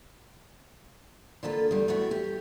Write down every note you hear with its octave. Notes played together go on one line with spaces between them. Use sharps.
D3 A#3 F4 A4 B4
E2 G3
A3 B3 E4 F#4
G4